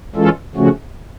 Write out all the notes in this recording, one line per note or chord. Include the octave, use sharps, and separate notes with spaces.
E3 G#3 C#4 F4 A4
C#3 F3 A3 C#4 F#4